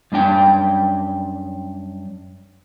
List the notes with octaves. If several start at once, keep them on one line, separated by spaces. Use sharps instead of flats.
F#2 G3 D4 G5